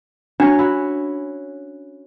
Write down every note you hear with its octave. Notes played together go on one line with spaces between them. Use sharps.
F#3 C#4 D4 C#5
E4 F#4